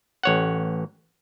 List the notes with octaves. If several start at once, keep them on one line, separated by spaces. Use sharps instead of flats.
A1 C#5 F#5